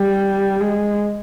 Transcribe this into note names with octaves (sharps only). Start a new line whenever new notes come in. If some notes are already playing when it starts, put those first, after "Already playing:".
Already playing: G3
G#3